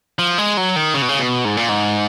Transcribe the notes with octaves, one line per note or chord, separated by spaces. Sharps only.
F3
G#3
F#3
D#3
C#3
B2
C#3
B2
G#2
A#2
G#2